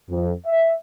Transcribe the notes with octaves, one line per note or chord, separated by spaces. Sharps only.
F2
E5